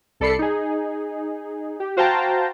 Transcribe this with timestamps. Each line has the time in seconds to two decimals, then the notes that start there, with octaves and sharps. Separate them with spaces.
0.20 C2 A4 D5 B5 C7 C#7
0.39 D#4 G#4
1.80 G4
1.97 F#4 C5 F5 G5 A5 A#5